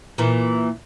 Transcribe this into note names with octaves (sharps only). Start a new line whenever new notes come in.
A#2 E3